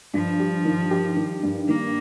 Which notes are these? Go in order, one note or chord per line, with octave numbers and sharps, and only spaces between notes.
G2 F3
G4
D#3
G4
D#3
G2
D#3 A#3